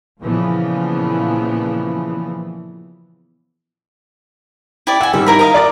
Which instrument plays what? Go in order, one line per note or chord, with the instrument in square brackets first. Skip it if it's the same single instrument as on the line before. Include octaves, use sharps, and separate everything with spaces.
[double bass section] A#2 C#3 E3 F3 B3
[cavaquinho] E4 G4 D5
[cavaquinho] E5 G#5 [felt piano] F#5
[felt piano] G#2 D#3 G3 [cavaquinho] E5
[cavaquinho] E4 A#4 B5
A#4 D#5 F5
[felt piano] D5 D6 A6